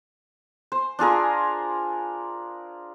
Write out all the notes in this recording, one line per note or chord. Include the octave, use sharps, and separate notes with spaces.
C5
D4 F4 G#4 A#4